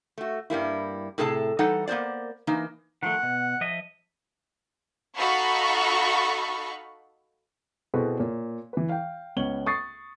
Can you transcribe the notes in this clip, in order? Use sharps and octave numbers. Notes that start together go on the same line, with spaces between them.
A3 F#4
G2 G3 A#3 E4
A2 C3 G#4 A4 B4 A5
E3 G3 D#4 A4 F#5
A#3 B3 A#4 C5 D5
E3 A#3 D#4
D#3 F3 A3 F#5
B2
F3 D#5 E5
D#4 F#4 A4 F5 B5 C#6
B2 C4 E4 G#4 A4 B4
A#2 C#5
E3 B4
F5 G5
C#2 B3 C#4 C#5 F#7 G7
C#6 D#6 A6 C7